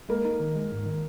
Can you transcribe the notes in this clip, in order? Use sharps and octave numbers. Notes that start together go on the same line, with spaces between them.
G#3 A#3
D#4
D#3
G#3
G#2
D#3